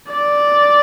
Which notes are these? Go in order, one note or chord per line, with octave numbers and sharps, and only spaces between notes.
D5